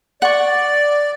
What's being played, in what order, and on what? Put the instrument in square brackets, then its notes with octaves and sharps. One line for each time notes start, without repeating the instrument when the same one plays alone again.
[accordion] D5 [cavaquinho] F#5 C#6